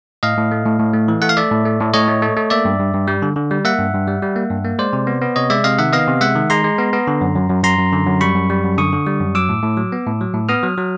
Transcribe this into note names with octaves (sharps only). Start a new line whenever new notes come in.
A2 D#5 F5
A2
A3
A2
A2
A3
E3
A3 F#5
F5
A3 D5 E5
A2
A3
A2
A2 C#5 D#5
A3
A3
A3
A#3 D5 E5
G2
G2
G2
G3
D3
D3
G3
A#3 E5 F#5
G2
G2
G3
G3
A#3
G2
A#3
G#3 C5 D5
C3
B3
B3
C3 C#5 D#5
G#3 D5 E5
C3 D#5 F5
D#3 E5 F#5
B3 D#5 F5
C3
G#3 E5 F#5
D#3
G#3 A#5 C6
G#3
B3
B3
D3
F#2
F#2
F#2
F#2 A#5 C6
F#2
D3
F#2
G3 B5 C#6
F#2
G3
F#2
D3 C#6 D#6
D3
G3
F#2
F#3 D6 E6
A2
A2
F#3
B3
A2
F#3
A2
B3 D#6 F6
F#3
F#3